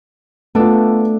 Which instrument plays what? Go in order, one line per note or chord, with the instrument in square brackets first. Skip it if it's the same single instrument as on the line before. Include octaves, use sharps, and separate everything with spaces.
[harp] A3 D4 A4 [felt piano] B3 F4